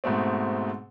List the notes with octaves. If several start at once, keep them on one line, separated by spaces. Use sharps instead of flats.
G#2 B2 A3 C4